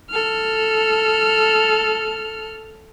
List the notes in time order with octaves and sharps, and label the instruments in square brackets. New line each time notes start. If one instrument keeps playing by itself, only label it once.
[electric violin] A4 F6